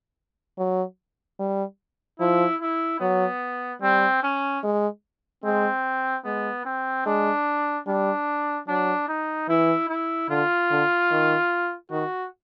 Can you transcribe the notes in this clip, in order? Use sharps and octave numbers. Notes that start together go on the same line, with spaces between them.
F#3
G3
F3 E4
E4
F#3 B3
G3 C4
C#4
G#3
G#3 C4
G#3 B3
C4
G#3 D4
G3 D4
F#3 D4
D#4
E3 E4
E4
D3 F4
D3
D#3
D#3 F#4